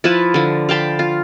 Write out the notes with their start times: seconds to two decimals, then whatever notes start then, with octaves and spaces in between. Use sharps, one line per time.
0.04 F3 E4 B4 A5
0.34 D3 F3
0.69 F5 G5 A5 B5
0.99 F4